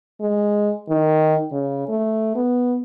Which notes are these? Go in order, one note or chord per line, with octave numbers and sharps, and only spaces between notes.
G#3
D#3
C#3
A3
B3